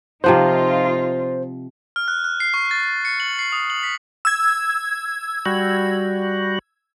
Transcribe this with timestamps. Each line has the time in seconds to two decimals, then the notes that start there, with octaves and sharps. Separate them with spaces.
0.24 C3 F3 D#4 F4 C5 F#5
1.96 F6
2.08 F#6
2.24 F#6
2.40 C7
2.54 C#6
2.71 A6
3.05 C#7
3.20 F#7
3.39 C7
3.52 D#6
3.70 F#7
3.83 B6
4.25 E6 G#6
5.46 G3 F#4